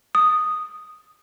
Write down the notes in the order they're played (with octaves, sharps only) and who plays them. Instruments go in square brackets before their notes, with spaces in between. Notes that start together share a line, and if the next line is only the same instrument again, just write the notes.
[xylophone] D#6